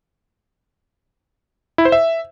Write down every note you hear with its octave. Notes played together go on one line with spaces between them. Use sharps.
E4
C5
E5